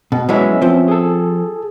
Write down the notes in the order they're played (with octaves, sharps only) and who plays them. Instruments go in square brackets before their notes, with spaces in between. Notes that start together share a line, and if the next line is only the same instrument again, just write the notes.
[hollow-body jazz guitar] B2
[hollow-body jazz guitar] E3 F#3 G#3 [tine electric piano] B3 C#4 E5
[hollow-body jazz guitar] F3 C4
[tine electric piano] G#4 A4